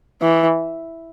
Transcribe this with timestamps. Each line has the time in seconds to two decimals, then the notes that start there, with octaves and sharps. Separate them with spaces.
0.22 E3